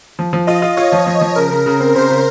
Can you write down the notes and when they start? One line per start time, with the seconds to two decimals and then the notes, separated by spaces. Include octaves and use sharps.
0.19 F3
0.33 F3
0.47 F4 D#5
0.62 F4
0.77 F4 C#5
0.92 F3
1.07 F3
1.21 F3
1.36 C#3 A#4
1.51 C#3
1.66 C#3
1.80 C4
1.95 C#3 C5
2.10 C#3